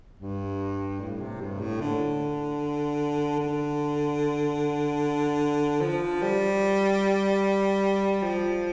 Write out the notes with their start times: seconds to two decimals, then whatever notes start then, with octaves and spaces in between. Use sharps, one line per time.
0.20 G2
1.01 A2
1.21 C3
1.41 G2
1.60 A2
1.80 D3
3.40 D3
5.81 F3
6.22 G3
8.22 F3